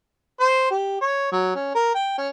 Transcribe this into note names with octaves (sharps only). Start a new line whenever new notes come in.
C5
G4
C#5
F#3
C#4
A#4
G5
C#4